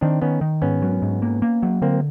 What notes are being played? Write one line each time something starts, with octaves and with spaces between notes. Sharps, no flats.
D#3 C4 D4
D#3 B3 C#4
D#3
G#2 B3 C#4
F#3
G#2
A#3
A#3
F#3
D3 A#3 C4